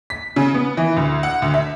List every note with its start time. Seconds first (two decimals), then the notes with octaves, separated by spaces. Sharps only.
0.10 B6
0.36 C#3
0.54 B3
0.77 E3
0.97 D2
1.23 F#5
1.42 D2
1.54 E5